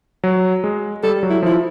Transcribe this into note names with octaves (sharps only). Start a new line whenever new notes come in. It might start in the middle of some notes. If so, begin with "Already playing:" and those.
F#3
G#3
G3 A4
F#3
E4
F3 E4